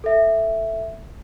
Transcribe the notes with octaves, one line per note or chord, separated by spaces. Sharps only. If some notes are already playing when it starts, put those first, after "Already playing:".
A4 E5